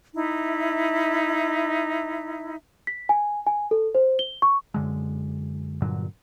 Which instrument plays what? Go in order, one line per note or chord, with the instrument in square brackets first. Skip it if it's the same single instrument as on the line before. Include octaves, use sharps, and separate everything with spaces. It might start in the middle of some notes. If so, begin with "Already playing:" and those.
[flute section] D#4 E4 E5
[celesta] B6
G#5
G#5
A4
C5
G7
C#6
[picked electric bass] F#2 D3 G#3
G2 A#2 D3 F#3